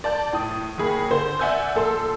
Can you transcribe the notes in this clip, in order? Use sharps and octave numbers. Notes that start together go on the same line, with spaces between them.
D5 A5 G6
A2 D#6
D#2 A#3 G#4 B5
D3 C5
D5 E5 F#5 G#5 E6 G6
A#1 A4 C6 E6